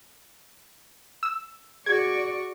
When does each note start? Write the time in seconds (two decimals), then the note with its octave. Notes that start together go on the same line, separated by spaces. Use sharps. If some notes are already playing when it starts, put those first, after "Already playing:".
1.23 E6
1.86 F#4 G#4 D5 C#6 G#6